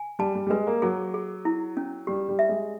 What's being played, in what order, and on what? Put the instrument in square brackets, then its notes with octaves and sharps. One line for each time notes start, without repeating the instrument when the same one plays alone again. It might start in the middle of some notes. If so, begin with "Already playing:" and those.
Already playing: [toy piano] G#5
[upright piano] G3 [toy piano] A5
[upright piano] G3
G3
[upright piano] G#3 [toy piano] B4
[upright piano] A#3
[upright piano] F#3 [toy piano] G#4
[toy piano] G#4
E4
C#4
[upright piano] G3 [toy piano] G4
[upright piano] G3
[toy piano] E5
[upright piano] G#3